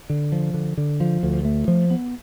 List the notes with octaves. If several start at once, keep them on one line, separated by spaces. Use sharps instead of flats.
D3
F3
D3
D3
F3
D2
A3
F3
B3